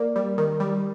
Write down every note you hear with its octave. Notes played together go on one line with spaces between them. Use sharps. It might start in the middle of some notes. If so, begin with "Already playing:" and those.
Already playing: A#3 D5
G3
D#3
G3